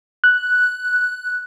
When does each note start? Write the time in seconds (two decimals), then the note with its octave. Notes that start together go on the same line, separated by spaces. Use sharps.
0.24 F#6